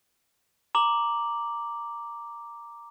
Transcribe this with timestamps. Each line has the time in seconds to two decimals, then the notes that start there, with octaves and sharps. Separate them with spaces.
0.75 A#5 D6 F#7